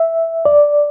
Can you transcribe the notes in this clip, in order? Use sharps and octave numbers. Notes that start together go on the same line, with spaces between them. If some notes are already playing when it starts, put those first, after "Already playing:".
Already playing: E5
D5